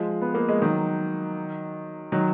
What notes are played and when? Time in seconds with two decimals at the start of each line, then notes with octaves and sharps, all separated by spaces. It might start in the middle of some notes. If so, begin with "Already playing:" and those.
Already playing: F3 G#3
0.21 B3
0.35 A#3
0.49 G#3
0.61 D#3 F#3
2.12 D#3 F#3